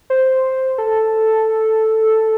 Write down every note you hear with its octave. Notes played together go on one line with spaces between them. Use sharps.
C5
A4